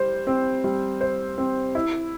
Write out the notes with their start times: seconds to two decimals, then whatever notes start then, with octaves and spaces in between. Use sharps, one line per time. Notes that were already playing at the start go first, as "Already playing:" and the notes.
Already playing: G3 C5
0.27 C4
0.64 G3
1.01 C5
1.38 C4
1.75 E4